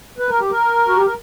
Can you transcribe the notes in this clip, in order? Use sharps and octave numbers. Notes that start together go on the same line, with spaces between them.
B4
A#4
G4
A#4
F#4
G4
A#4